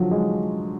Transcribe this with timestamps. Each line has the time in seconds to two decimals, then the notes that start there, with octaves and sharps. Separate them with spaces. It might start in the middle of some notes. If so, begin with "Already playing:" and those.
Already playing: D3 F3 F#3
0.11 G#3